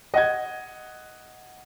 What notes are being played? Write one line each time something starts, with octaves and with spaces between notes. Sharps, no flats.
D#5 F#5 G#6